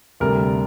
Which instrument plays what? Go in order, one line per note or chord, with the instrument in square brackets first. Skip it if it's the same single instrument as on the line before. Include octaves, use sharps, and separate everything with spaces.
[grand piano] D2 C3 G3 A#4